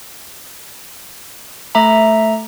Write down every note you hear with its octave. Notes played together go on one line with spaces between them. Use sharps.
A3 E5 A#5